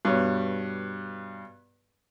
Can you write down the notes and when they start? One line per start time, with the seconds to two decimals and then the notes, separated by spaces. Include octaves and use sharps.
0.05 G2 B2 C#5